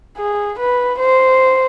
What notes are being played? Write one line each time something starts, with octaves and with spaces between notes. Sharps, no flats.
G#4
B4
C5